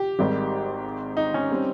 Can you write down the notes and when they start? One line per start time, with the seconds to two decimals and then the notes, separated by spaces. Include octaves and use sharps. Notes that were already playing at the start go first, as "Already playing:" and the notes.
Already playing: G4
0.19 G#1 G#2 D#3 G3
1.17 D#4
1.34 C#4
1.51 G3 C4